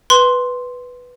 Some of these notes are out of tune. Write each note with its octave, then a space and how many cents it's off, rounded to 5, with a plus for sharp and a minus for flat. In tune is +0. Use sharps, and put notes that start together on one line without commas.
B4 +0 C6 +0